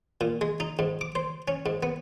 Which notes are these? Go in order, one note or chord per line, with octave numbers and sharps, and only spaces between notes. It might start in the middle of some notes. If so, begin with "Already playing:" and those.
A#2
G#3
D#4
G#2
D6
C5
C#4
G#2
B3